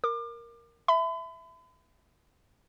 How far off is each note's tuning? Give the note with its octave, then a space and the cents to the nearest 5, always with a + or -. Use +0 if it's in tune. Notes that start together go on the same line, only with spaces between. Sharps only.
A#4 +0 D6 +30
E5 +0 B5 +40